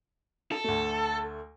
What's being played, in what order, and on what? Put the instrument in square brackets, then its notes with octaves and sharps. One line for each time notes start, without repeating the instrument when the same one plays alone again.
[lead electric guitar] A4
[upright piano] D2 A3